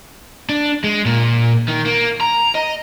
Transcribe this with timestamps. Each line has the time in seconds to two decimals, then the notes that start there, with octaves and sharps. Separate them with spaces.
0.49 D4
0.84 G#3
1.06 A#2
1.68 D#3
1.85 A#3
2.20 A#5
2.55 D#5